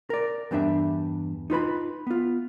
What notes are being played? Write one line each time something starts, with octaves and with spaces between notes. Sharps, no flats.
A#4 D5
E2 G2 G3 D4 E5
D#4 F4 B4 B5
B3 F4